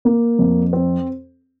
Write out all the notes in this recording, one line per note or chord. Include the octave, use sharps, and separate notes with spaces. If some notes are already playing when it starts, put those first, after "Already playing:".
A#3
F2
C4